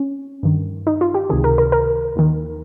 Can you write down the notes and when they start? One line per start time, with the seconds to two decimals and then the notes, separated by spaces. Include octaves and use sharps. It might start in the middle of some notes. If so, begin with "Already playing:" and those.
Already playing: C#4
0.43 G2 D#3
0.87 D#4
1.01 F4
1.14 G4
1.29 C#2 C3 D#3 G#4
1.44 A#4
1.58 A#4
1.72 A#4
2.16 D#2 D#3